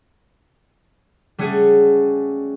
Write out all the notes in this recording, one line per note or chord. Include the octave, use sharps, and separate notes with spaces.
G3 A3 C#4 F#4 G#4